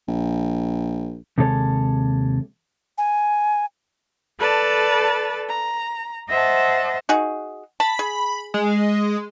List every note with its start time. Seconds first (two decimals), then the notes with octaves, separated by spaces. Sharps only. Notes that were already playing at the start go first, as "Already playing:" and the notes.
0.08 A#1
1.38 D#2 C3 G#3 A4 C#5
2.98 G#5
4.38 A4 B4 D5 A5
5.47 A#5
6.28 C5 D#5 E5 F#5 A5
7.09 D#4 F#4 G#4
7.80 A5 B5
7.99 G#4
8.54 G#3